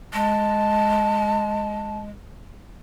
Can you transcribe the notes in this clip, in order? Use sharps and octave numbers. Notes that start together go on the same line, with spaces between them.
G#3 A5